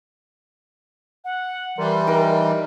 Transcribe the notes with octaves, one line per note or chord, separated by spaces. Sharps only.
F#5
E3 G3 A#4 C6
D#4 A#4